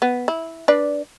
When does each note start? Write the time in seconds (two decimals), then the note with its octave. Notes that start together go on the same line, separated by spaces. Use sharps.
0.02 B3
0.28 E4
0.68 D4 B4 D5